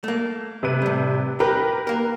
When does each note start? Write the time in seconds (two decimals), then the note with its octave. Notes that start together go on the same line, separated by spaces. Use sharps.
0.04 A3 A#3
0.63 C3 B4 D#7
0.82 A2 G3
1.40 G4 A#4 B4 B5
1.87 A#3 A#4